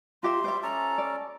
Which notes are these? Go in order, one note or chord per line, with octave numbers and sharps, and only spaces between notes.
F4 G4 E5 A#5 C6
G3 C5 E5 D6
C#4 A4 A5 A#5
D5